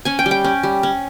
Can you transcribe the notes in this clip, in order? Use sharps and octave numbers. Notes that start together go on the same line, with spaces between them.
C#4 G#5
G5
G3
G5
C#4
G3
C#4